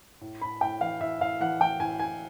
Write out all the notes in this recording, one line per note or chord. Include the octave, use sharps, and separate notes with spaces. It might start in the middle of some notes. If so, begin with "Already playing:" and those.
A2
A2 B5
A2 G5
E3 F5
A2 E5
A2 F5
E3 F#5
E3 G5
A2 G#5
A2 G#5